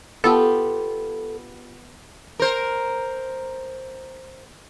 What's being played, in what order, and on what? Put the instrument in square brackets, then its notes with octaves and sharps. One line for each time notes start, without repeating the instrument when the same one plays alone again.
[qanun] B3 F4 G4 [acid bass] A4
[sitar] A#4 C5